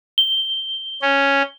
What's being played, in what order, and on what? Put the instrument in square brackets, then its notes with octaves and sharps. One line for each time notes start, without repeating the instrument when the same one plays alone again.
[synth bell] G7
[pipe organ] C#4